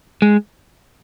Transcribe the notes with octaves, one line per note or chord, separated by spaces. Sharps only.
G#3